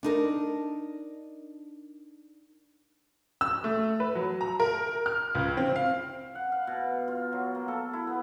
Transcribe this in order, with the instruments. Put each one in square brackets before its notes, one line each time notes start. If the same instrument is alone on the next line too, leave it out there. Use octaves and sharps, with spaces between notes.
[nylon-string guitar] D4 D#4 A#4
[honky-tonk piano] E6
A3
B4
F#3
A#5
A#4
F6
C#2
C4
F5
[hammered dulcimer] F#5
F5
B2
F4
F#3
A#3
A4
E4
B3